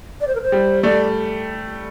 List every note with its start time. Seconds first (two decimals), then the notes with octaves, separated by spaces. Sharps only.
0.21 D5
0.27 C5
0.35 A#4
0.42 C5
0.52 G3
0.83 A3 D5